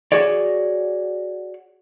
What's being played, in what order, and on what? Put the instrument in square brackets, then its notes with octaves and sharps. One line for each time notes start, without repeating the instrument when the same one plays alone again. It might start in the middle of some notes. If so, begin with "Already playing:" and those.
[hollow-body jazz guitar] F#4 G#4 C#5 D5